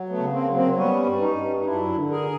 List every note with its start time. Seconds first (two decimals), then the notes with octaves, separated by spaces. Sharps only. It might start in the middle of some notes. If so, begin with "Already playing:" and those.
Already playing: F#3
0.09 A3 B3
0.18 C#3
0.32 A#3 C4
0.47 F#3
0.54 A#3 C4
0.76 G3 B3 C#4
1.06 G2
1.21 C#4 D#4
1.36 G2
1.60 D#4
1.65 F#2 D4 E4
1.95 D3
2.10 G#4 A#4